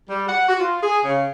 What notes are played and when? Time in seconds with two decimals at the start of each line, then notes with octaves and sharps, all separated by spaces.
0.08 G3
0.27 F#5
0.47 F#4
0.60 F4
0.81 G#4
1.03 C#3